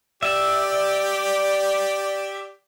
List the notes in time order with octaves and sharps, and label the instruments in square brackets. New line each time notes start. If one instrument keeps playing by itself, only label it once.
[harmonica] G4 [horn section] D5 [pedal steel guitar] E5